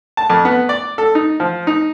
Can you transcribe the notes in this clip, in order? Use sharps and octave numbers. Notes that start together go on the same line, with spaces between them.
A5
F2
B3
D5
A4
D#4
F3
D#4